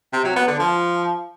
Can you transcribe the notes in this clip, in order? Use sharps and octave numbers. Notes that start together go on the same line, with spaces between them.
C3
F#3
B3
D3
F3